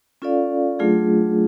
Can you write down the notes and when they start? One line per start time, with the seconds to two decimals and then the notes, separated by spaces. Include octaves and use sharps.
0.22 C#4 F4 A4 D5 F5
0.79 F#3 A3 D4 F4 G#4